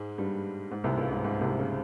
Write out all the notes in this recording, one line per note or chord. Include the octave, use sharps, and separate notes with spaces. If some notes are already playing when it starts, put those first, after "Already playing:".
Already playing: G#2 G#3
G2 G3
G#2
C2 C3
C#2 C#3
G#2
G#2
C2 C3
C#3